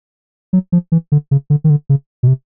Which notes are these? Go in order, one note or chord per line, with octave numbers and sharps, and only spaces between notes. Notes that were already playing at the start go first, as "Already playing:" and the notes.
F#3
F3
E3
D3
C#3
D3
D#3
D3
C#3
B2
C3